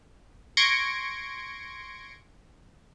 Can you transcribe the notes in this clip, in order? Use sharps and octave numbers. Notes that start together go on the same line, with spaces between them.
C6 C#6 G#6 A#6 C#7 D7